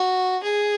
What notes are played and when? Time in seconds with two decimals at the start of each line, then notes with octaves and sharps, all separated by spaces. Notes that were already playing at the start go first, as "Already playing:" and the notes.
Already playing: F#4
0.43 G#4